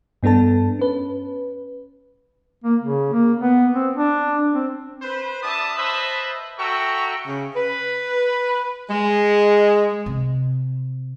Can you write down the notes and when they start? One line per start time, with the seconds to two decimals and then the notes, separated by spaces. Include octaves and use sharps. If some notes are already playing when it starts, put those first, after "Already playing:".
0.23 G2 B3 D4 A4 A5
0.79 C#4 B4
2.64 A#3
2.82 C#3
3.13 A#3
3.41 B3
3.74 C4
3.96 D4
4.54 C4
5.02 B4 C5
5.42 D4 G4 E5 A5 B5 D#6
5.76 B4 C5 D#5 E5 A5 B5
6.58 F#4 A4 E5 G5 A#5 C#6
7.26 C#3
7.54 B4
8.90 G#3
10.06 C3